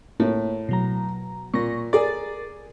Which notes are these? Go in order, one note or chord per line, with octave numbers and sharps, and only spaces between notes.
A2 A#3
B2 F#3 A#5
A#2 C#6 A#6
G#4 A#4 D5 A6